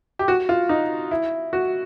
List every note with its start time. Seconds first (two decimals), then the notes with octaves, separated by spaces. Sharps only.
0.19 G4
0.28 F#4
0.49 F4
0.69 D#4
1.11 E4
1.53 F#4